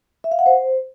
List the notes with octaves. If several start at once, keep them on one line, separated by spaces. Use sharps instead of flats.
E5
F5
F#5
C5